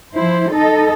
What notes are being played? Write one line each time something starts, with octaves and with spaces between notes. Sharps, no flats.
F3 E4 C5
D#4 A4 D#5